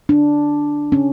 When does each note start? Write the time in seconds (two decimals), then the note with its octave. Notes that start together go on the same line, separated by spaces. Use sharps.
0.09 D4
0.92 C#4